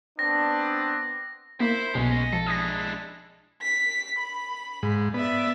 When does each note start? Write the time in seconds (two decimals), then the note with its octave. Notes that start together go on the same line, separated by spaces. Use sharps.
0.19 B3 C4 D4 A#6
1.60 A#3 E4 C5
1.95 B1 B2 G#3 C#4
2.10 D#5
2.33 F3 A4
2.46 G#3 D4 E4 D#6 A#6
3.62 B6
4.19 B5
4.83 G#2
5.14 B3 D5 E5